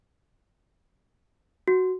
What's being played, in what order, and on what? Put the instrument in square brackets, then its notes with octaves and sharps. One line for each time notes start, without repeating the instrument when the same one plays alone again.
[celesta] F#4